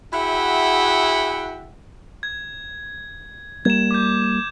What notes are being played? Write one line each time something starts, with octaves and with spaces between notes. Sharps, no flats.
E4 F#4 G#4 E5 F#5 G5
G#6
G3 A#3 G#6 E7
D6 G6